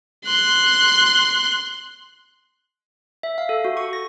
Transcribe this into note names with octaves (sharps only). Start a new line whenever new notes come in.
C6 F#6
E5
F5
A4
F#4
C#6
A#6